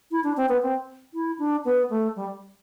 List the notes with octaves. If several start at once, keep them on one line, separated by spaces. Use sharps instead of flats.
E4
D4
C4
B3
C4
E4
D4
B3
A3
G3